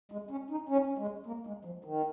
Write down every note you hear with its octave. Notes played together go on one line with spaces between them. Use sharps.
G#3
C#4
D#4
C#4
G#3
A#3
G#3
F3
D#3